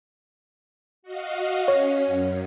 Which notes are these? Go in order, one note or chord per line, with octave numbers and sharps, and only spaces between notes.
F#4 D#5 F5
C#4 C#5
F#2